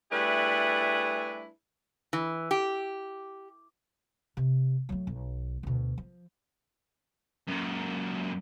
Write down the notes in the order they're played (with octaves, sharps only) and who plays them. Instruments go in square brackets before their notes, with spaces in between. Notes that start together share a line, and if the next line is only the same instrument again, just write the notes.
[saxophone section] G3 A3 D4 E4 G#4 B4
[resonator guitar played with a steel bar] E3
G4
[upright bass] C3
F#3 A3
B1
D2 B2
F3
[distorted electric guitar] F#2 A#2